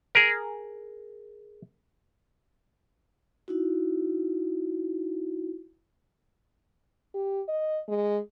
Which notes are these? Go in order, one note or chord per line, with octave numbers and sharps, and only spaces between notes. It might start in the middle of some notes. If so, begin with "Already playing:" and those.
G#4 A#4
D#4 E4 F#4
G4
D#5
G#3